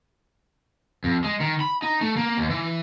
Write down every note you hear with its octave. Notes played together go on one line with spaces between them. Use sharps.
F2
G#3
D#3
B5
D#4
A3
A#3
D#2
E3